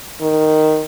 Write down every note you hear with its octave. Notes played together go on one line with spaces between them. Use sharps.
D#3